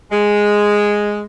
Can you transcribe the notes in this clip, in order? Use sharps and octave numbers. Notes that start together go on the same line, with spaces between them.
G#3